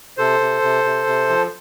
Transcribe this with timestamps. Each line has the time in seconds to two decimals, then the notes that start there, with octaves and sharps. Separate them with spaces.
0.17 C3 A4 C5
0.40 C3
0.62 C3
0.84 C3
1.07 C3
1.29 F3